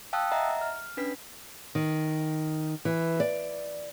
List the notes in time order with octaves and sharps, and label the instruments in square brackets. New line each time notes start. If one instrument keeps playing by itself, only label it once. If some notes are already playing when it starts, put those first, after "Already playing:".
[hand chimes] F5 G5 A5 D#6 E6 F#6
D#5 E5 F#5 A#5
F6
C#4 D4 B4 B6
[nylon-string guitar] D#3
E3
D5